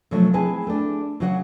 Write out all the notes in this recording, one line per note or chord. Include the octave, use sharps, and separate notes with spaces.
C3 F3 F#3 A3 C#4
C4 E4 G#4 B4 G#5 A5
A3 D4
C#3 F#3 F#4 C#5 D5 F#5